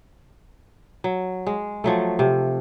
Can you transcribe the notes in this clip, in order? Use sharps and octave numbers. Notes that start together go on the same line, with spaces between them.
F#3
G#3
F3 F#3 A3
C3